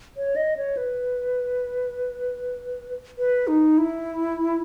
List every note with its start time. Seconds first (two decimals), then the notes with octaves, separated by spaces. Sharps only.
0.17 C#5
0.36 D#5
0.57 C#5
0.77 B4
3.18 B4
3.47 D#4
3.78 E4